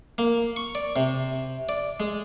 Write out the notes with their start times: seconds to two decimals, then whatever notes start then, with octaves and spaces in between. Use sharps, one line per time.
0.18 A#3
0.56 C#6
0.75 D5
0.96 C3
1.69 D5
2.00 G#3